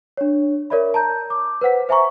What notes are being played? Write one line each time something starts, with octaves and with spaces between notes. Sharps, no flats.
D4 C#5
A#4 C#5 D5 E5 B5
A5 A#5 G6
D6
B4 C5 F#5 B6
C5 E5 G#5 A#5 C#6